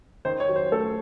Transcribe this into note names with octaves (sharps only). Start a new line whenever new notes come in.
D#3 C5
C#5
F#3
C5
A3 A4